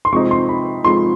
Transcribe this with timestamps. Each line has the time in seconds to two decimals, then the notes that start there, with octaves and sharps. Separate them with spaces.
0.05 C6
0.12 C3 F3 G#3 C4 D#4 C#6
0.31 C6
0.49 B5
0.84 C3 F3 G#3 C4 D#4 C6